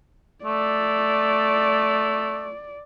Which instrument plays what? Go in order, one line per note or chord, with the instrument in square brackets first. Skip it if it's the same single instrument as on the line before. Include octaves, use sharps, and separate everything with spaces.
[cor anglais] A3 [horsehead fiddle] D5